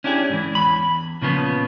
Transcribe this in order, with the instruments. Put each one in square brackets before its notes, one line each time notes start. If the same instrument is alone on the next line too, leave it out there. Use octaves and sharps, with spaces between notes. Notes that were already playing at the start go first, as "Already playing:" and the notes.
[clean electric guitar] C#4 D4 E4 G4 G#4
G#2 E3
E2 B5
A#2 C#3 F3 B3